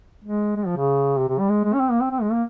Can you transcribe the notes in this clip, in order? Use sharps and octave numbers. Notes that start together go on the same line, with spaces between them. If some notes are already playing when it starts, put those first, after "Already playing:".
G#3
G#3
F3
C#3
C3
C3
G3
G#3
G#3
C#4
C4
A#3
C4
C4
G#3
A#3